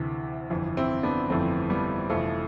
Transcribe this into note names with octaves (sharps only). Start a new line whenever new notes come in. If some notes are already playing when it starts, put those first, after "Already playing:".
Already playing: D2 C3 E3
G1 F2 E3
C4 E4
B3 D4
G1 F2 E3 A3 C4
G3 B3
F1 F2 E3 F3 A3